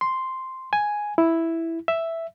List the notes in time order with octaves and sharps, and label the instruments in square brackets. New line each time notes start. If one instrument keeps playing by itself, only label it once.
[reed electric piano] C6
G#5
E4
E5